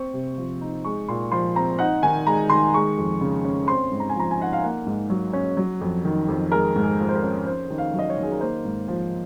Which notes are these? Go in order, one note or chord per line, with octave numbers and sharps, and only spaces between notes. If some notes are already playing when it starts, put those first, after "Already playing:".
Already playing: C4 C#6
C3
F3
D#4
G#3 C#6
A#2 C6
F3 C6
C4 A#5
D#4 F#5
D#3 G#5
G#3 A#5
D#3 C6
G#3 C#6
F2
C#3
C#4
C4 C6
G#2
A#5
G#5
F3 A#5
G#5
D#4 F#5
F5
A#3 F#5
G#2
F#3
C#4
F#3
F2
D#3
F2
G#3 A#4
G#2
G#4
F3
C5
A#4
C#4
C#4 C5
D#3
F5
F#3
D#5
C#5
D#3
G#4
A#4
A#3 C5
G#2
F3